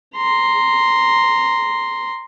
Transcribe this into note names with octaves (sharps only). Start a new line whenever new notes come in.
A#5 C6